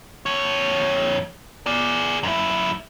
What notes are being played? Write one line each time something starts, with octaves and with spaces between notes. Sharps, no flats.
F2 C#5
G#4 D5
F#2 E4